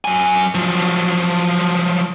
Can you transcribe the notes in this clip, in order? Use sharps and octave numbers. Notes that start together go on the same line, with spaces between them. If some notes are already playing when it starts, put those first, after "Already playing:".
F#3 G#5
F3 F#3